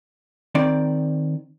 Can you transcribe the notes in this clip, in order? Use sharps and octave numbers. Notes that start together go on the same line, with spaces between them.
D#3 C4 D5